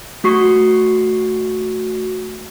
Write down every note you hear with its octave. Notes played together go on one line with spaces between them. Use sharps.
A3 F#4 C#6 C7